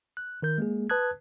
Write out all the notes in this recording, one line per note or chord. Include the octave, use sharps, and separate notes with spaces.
F#6
D#3 A#4 G6
G#3 A#3 G#4
B4 A5 D#6 F#6 G#6